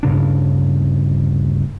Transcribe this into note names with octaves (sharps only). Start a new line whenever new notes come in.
D2 G2 C#3 D4